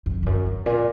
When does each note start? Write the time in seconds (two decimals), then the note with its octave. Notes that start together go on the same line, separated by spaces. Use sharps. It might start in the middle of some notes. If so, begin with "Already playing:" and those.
0.06 F2
0.23 F2
0.26 F#2
0.47 G2
0.66 A#2